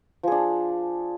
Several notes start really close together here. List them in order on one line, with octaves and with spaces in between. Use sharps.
F3 G#4 D4